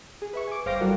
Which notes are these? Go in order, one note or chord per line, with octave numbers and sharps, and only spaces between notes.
G#4
B4 E5 C#6
G#5 D6
G1 C5 F5 G5 D6 A#6
F#3 G3 F#4 A4 A#4 D5